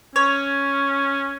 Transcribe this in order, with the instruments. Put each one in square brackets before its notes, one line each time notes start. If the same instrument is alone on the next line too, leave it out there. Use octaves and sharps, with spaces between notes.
[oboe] C#4 [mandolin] C#5